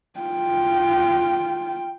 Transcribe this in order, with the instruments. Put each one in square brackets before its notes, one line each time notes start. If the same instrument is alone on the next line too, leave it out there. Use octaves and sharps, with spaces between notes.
[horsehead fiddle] F4 G5